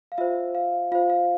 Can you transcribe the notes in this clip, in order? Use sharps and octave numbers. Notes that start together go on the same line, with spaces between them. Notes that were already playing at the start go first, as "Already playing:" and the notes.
F5
F4 C5 E5
F5
F4 C5 F5
F5